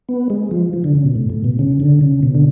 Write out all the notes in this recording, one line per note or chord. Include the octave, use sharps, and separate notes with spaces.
B3
G#3
F3
F3
D3
C#3
B2
A2
A2
B2
C#3
D3
C#3
B2
D3